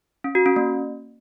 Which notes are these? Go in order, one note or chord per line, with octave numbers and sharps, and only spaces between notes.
C#4
F#4
C#4
A#3